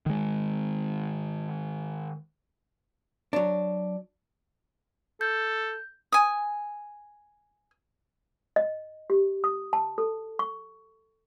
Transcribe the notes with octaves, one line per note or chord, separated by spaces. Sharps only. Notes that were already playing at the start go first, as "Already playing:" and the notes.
D#3 G#3
F#3 D4
A4 G6
G#5 D#6
D#5
G4
D#6
A5
A4
C#6